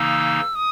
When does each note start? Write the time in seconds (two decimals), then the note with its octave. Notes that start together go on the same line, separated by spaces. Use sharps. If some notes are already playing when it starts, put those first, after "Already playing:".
Already playing: C#3 E3 A#3 D#4 E6
0.55 D#6